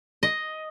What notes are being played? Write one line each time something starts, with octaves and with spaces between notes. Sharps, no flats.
D#5